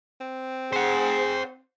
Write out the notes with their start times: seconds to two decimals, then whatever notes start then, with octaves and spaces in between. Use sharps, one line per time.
0.21 C4
0.73 G#4 C5 F#5